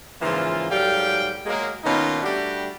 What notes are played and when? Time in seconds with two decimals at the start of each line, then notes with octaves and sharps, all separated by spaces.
0.22 G#2 C#3 E3 F3 A#3 F4
0.70 G#2 F#3 G3 A4 F5 G5
1.46 F#3 G#3 A#3
1.84 B2 D#3 A#3 C#4 D#4 F4
2.23 G3 A3 D4 F#4 G4